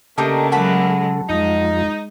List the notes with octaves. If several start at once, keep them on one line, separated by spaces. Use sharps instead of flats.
C#3 A3 A#3 D4 D#4 G4 A4
F#3 G#3 F#4 A5 B5
F2 G#3 D#4 F4